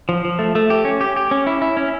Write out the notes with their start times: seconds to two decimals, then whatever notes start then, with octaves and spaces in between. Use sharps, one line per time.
0.09 F3
0.25 F3
0.39 A3
0.55 A3
0.70 G4
0.85 C#4
1.01 G4
1.16 G4
1.31 C#4
1.47 E4
1.62 E4
1.77 C#4